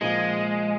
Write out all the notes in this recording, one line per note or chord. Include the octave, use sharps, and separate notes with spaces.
A#2 F3 G#3 A#3 F4